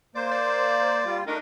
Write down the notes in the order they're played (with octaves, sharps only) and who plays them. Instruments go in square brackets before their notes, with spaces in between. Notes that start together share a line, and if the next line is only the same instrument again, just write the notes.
[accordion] A#3 C5 [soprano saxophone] D5
[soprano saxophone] D5
[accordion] G3 F4
[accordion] A3 D4 A#4 [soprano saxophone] D#4